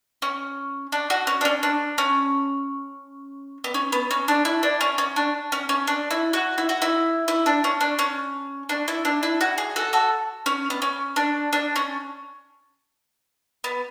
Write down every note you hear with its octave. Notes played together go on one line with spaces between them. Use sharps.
C#4
D4
F#4
C#4
D4
C#4
D4
C#4
B3
C#4
B3
C#4
D4
E4
D4
C#4
C#4
D4
C#4
C#4
D4
E4
F#4
E4
F#4
E4
E4
D4
C#4
D4
C#4
D4
E4
D4
E4
F#4
G#4
F#4 A4
F#4 A4
C#4
B3
C#4
D4
D4
C#4
B3